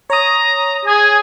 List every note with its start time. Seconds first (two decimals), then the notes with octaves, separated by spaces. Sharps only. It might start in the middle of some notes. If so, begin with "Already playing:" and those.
0.10 C#5 A#5 D#6
0.85 G#4 G#5